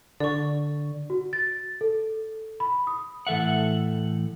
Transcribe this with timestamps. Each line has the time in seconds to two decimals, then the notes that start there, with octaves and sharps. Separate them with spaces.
0.20 D3 D5 C#6
1.10 F#4
1.33 A6
1.81 A4
2.60 B5
2.87 D#6
3.27 A2 E3 A4 E5 F#5